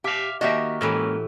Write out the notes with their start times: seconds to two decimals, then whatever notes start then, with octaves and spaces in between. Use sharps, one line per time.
0.04 G4 E5 F5
0.41 D#3 A#3 F#4 G4 D#5 E5
0.81 A2 E3 G#3 A#3 C#4 B4